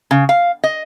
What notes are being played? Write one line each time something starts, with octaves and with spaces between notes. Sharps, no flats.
C#3
F5
D#5